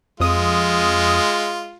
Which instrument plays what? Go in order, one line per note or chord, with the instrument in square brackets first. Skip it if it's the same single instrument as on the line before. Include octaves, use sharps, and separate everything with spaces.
[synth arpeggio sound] F2 D#6 [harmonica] G#3 F4